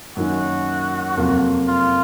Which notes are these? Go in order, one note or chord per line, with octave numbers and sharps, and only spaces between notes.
F#2 D#3 A#3 C#4 F#4
F2 C3 F#3 A#3 F4
F4